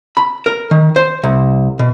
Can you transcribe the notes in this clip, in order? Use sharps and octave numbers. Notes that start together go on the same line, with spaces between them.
B5
A#4
D#3
C5
C2
B2